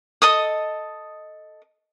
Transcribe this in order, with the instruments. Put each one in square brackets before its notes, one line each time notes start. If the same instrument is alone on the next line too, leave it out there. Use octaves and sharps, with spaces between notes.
[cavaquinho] A4 D#5 D#6